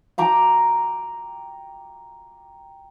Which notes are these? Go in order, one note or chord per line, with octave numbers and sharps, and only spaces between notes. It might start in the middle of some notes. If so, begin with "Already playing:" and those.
G5 A#5 D6